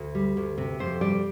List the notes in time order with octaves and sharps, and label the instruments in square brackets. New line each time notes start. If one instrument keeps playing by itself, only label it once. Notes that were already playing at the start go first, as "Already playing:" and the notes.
Already playing: [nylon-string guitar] D2
G3
D2
C3
F2 C5
G3 D5